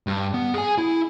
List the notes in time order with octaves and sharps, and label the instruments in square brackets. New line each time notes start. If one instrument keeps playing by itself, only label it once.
[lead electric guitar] G2
B3
G#4 G#5
E4